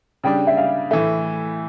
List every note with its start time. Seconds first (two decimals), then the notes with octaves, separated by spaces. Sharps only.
0.24 C#3 G3 D4 G5
0.47 E5
0.57 F5
0.91 A2 E3 A3 E5